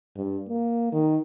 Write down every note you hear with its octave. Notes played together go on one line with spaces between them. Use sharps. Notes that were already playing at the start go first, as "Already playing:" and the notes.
G2
A#3
D#3